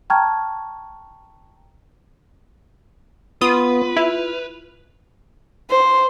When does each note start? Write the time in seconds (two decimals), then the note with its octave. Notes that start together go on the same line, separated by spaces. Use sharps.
0.10 G5 A5 A#5 C#6 F6 G#6
3.41 B3 F4 B4 D#6
3.97 E4 F6
5.70 C5